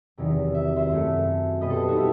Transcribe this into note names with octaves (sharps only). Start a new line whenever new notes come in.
E2 C3 D#3 F#3
E5
C5 E5
F#2 F#3 A3
B2 G3 B3 B4 D#5
A4 C5
D#4 F#4
E4 G4